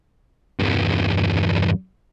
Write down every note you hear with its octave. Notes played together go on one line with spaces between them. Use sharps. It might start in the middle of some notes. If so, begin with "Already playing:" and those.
E2 G2